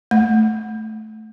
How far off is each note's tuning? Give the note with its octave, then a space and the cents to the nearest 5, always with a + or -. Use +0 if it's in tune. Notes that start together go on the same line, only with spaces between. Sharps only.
A3 -10